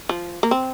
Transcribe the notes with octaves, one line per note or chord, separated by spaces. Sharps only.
F3
A#3
C4